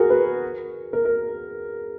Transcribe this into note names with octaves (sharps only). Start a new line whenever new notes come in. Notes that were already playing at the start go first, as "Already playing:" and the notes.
Already playing: F#4 G#4 A#4
B4
A#4
A#4